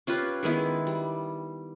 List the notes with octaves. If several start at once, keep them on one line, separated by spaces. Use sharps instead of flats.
C#4 F4 G4 B4
D#3 G#3 B3 E4
G3